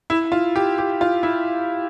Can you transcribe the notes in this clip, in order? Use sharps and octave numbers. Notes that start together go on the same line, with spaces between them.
E4
F4
G4
G4
F4
E4